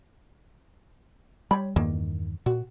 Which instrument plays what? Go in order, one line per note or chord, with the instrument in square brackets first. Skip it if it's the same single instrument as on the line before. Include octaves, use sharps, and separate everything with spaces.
[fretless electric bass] G3 [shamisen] C#5 B5
[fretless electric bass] E2 G2 D#3 [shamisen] A#3
[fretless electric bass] A#2 [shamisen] F#4